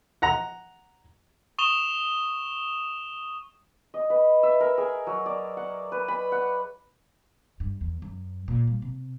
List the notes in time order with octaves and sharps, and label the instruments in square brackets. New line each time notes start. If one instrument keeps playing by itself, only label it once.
[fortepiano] F#5 A#5
[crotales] C#6 D#6 E7 F7 G7
[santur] D#5
B4
E5
A#4
G#4
F#3
D5
F#5
B4
B5
F#5
[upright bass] G2
E2
F#2
A#2
G3
C3